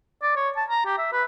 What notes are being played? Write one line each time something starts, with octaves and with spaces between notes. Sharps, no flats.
D5
C#5
A5
A#5
G4
E5
B4